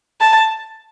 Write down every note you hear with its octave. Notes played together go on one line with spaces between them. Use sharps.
A5